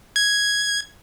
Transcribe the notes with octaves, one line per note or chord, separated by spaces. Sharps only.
G#6